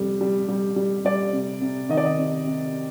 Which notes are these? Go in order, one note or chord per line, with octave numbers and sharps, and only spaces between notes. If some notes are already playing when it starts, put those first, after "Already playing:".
Already playing: F2 C3 G3
G3
G3
G3
G3 D5
C3
C3
D#3 D#5
D5
D#5
C3
C3